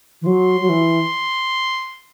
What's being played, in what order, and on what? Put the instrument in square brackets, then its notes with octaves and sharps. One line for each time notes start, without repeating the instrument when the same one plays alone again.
[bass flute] E3
[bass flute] F#3 [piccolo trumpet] C6
[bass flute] F#3
E3